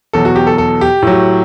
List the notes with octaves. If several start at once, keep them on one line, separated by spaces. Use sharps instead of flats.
E2 B2 F#3 A4
F#4
G4
A4
A4
G4
A2 F#3